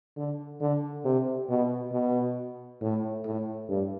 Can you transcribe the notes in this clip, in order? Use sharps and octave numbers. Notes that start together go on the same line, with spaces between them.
D3
D3
C3
B2
B2
A2
A2
G2